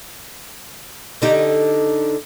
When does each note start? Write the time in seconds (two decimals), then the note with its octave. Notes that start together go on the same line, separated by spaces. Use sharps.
1.22 D3 D#4 G4